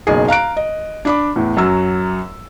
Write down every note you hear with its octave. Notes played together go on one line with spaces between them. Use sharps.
F#1 B1 G#4
F5 A#5 F#6 D7
D#5
D4 B5 D6
E2 A2
F#2 F#3 E6